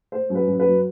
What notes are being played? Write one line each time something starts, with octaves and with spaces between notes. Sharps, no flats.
A3 C5
F#2
B4
F#2
B4
F#3